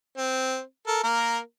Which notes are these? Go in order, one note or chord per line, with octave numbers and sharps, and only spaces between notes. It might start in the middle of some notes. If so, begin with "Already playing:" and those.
C4
A4 A#4
A#3 A#4